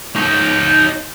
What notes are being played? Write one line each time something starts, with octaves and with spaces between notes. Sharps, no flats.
D#4 C#5